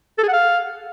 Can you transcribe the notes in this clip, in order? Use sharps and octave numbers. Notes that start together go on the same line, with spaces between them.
A4
G#4
F#5
F5